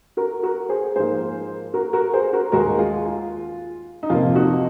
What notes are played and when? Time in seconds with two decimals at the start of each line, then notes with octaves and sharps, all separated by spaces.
0.17 F#4 A#4
0.43 F#4 A#4
0.69 G#4 C5
0.95 G#2 F3 A#3 G#4 C5
1.74 F#4 A#4
1.93 F#4 A#4
2.13 G#4 C5
2.33 F#4 A#4
2.52 D#2 D#3 G#3 F#4 A#4
2.79 F4 G#4
3.05 F4
4.03 D#4
4.10 F2 C3 F3 A#3 F4
4.35 D#4 F#4